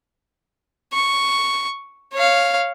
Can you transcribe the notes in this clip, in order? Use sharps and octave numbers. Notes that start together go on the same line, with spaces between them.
C#6
C#5 F5